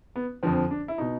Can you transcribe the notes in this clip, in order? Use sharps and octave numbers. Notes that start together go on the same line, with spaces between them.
B3
F2 D3 F3 C4
D4
E4
B2 D#4